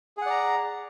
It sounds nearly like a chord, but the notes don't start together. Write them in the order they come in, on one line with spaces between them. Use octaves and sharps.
G#4 F#5 D5 A#5